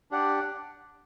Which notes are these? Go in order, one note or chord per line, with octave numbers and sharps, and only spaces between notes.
D4 G4 D5 F#5